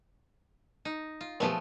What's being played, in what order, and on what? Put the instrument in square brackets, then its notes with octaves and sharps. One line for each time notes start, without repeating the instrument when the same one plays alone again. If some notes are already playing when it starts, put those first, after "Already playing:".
[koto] D#4
F4
[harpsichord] F#2 B2 G4 [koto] F3 G#3 A3